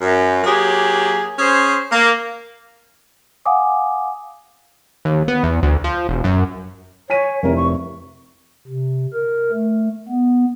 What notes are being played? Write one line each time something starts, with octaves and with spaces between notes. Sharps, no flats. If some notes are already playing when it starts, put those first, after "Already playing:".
F#2
F#3 A#3 G4 G#4
C#4 G#4 C5
A#3
F5 F#5 G#5 D6 D#6
D#2
B3
E2
D2
F3
E1
F#2
C#5 G#5 B6 D#7
F1 C3 E4 A#4
C#6
C3
A#4
A3
B3